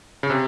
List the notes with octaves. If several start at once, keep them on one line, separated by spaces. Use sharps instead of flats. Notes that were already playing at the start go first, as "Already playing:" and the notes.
C#3
C3